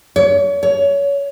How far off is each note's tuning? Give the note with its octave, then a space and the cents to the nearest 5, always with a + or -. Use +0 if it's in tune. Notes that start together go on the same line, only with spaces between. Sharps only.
C#5 +35
C#5 +25